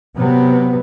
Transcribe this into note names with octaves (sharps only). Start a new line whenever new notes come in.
C3 F#3 B3